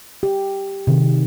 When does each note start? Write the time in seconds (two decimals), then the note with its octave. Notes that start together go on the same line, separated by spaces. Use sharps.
0.23 G4
0.87 C3 D#3